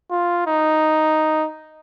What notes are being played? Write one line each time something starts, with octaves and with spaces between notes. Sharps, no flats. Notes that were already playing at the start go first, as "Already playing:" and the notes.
F4
D#4